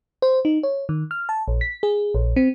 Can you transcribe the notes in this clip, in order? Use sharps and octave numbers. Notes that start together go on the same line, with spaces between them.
C5
D#4
C#5
D#3
F6
A5
A#1
B6
G#4
A#1
C4